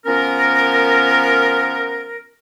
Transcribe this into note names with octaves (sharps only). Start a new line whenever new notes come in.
F3 B3 C#4 A#4